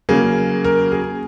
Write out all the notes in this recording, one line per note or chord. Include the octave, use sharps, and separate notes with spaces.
C#3 F#3 A#3 G#4
A#4
G#4